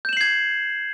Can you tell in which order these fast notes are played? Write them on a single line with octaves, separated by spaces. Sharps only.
G6 E7 F#7 C7 G#6